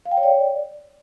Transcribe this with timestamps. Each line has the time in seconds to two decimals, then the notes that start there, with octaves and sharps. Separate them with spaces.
0.06 F5
0.11 G5
0.17 C#5
0.23 D5